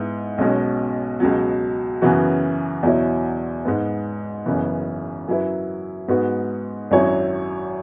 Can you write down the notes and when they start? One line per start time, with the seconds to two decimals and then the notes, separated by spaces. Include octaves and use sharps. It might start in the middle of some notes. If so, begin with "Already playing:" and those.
Already playing: G#2 G#3 B3 E4
0.38 B1 B2 G#3 C#4
1.20 C#2 B2 F#3
2.02 F#2 C#3 E3 B3 F#4
2.83 E2 B2 F#3 E4 C#5
3.65 G#2 G#3 B3
4.46 F#1 F#2 C#3 E3 B3
5.28 F#2 F#3 E4 B4
6.08 G#2 G#3 B3 F#4 B4
6.91 G#1 F#2 F#3 E4 C#5